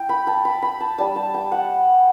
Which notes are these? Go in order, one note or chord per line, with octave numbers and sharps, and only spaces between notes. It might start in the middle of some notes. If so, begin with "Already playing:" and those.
Already playing: E4 G5
B5
A5
B5
B5
A5
G3 D4 A5
A5
G5
F#5